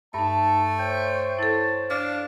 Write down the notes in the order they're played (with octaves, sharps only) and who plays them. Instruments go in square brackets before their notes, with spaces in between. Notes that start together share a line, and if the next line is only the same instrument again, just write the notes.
[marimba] G2 D#4 [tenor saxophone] A3 [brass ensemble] A5
[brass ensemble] C5 C#5 [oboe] G5
[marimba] E4 A4 [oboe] A5
[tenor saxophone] D4 [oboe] F5 [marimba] D6